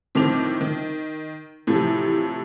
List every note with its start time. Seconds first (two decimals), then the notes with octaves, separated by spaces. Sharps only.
0.15 A2 D#3 F3 C4 D6 F7
0.61 D#3
1.67 A2 C3 E3 F3